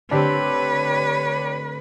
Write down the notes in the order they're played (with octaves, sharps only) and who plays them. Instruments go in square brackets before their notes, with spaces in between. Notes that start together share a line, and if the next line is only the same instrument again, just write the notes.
[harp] D3 A3 C4 [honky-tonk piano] D4 G4 [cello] B4 [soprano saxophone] C#5